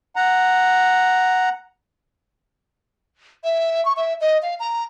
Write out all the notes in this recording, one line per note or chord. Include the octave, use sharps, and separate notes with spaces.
F#5 A#5
E5
C#6
E5
D#5
F5
A#5